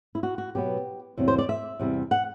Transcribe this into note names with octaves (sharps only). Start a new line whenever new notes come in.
E4
F#4
F#4
B2 F#3 B3 G4
E2 C3 F#3 C4
C5
D5
E5
E2 C3 G3
F#5